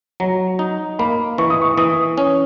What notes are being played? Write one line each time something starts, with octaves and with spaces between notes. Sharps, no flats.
F#3 A#5
D#4
A#3 B5
E3 C#6
D#6
C#6
E3 D#6
C#4